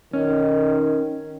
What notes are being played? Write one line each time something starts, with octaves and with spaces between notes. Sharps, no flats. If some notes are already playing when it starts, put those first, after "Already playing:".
D#3 C#4